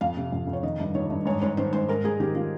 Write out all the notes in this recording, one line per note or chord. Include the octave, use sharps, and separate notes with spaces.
F2 F5
C3
F2
F2
C#5
D#3 D#5
G2
D#3 C#5
G2
G#2 C#5
G#2 C#5
D#3 C5
G#2 C5
G#2 A#4
G#2 G#4
D#3 G4
D#3 F4